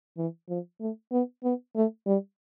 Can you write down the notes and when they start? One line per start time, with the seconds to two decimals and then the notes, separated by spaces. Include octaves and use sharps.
0.17 E3
0.49 F3
0.81 A3
1.12 B3
1.44 B3
1.76 A3
2.06 G3